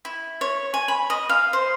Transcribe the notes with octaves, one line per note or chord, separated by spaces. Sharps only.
E4
C#5
G#5
B5
D#5
F5
C5